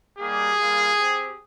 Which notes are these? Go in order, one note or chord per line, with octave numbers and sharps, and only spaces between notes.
G3 A#3 D#4 G4 G#4
G3 A#3 F4
C4 G4